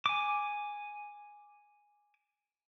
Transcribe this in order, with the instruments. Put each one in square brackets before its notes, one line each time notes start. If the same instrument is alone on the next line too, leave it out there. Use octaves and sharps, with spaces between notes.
[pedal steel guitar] G#5 D6